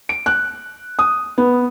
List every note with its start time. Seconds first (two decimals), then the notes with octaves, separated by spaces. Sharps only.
0.09 D7
0.26 F#6
0.99 D#6
1.38 B3